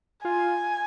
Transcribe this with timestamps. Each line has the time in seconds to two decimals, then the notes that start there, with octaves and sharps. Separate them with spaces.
0.24 F4 G#5